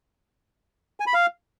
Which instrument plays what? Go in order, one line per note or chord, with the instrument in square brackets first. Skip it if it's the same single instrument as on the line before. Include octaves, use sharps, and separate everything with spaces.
[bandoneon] G#5
B5
F5